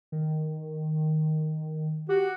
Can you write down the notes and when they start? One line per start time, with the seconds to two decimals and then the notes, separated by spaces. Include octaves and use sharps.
0.12 D#3
2.09 F#4 G4